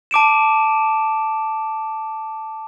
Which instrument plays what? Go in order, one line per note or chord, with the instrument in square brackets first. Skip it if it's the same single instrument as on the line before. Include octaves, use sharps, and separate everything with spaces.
[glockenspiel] A5 D6 D7 E7